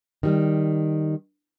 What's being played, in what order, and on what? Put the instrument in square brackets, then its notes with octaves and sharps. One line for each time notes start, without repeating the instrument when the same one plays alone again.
[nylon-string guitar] D#3 G3